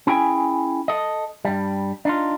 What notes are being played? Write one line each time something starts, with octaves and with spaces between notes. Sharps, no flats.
C#4 E4 G#4 G5 G#5
A4 D#5
G2 G3
D4 D#4 F4